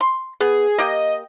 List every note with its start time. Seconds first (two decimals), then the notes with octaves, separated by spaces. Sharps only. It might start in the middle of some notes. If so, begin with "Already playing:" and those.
0.01 C6
0.41 B3 G#4
0.78 A#3 G4 D#5 G5